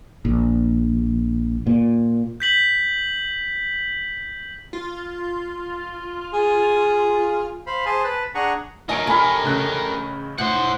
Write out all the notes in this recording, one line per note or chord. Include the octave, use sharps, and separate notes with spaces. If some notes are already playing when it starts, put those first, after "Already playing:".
A#1
A#2
G6 B6 F#7
F4
G#4
C5 F5 B5
G#4 C5 G#5 A5
B4 A5
D4 G#4 F#5 G#5 A#5 C#6
F4 A#4 C#5 D#5 G#5 D7
G4 A4 G#5 A#5 B5 F6
A1 C#3 F#6
A2 C5 F#5 G6